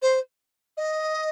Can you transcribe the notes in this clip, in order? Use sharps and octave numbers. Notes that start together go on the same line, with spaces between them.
C5
D#5